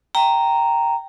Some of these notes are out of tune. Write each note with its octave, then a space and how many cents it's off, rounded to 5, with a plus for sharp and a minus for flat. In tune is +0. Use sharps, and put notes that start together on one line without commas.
G5 -5 A#5 -5